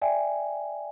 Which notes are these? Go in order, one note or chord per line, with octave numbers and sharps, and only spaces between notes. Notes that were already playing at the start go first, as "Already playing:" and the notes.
D5 E5 G5 G#5